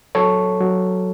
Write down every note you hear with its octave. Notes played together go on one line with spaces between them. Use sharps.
F#3 A4 C#5
F#3